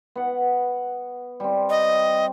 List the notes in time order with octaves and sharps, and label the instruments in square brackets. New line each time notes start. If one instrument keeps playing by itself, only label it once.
[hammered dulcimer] B3 F#5
G3 C4
[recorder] D#5